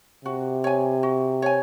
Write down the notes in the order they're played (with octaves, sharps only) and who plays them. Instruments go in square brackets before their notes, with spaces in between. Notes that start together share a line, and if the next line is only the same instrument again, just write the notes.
[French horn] C3 [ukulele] F#4
[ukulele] C#5 G#5
F#4
C#5 G#5